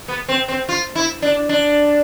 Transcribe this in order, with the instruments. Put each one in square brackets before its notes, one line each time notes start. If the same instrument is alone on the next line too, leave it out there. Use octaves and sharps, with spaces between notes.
[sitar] B3
C4
C4
F4
E4
D4
D4